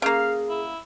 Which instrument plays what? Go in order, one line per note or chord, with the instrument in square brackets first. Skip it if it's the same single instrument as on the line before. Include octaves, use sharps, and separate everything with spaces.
[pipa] C#3 A#3 [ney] G#4 [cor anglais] F5
[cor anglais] E4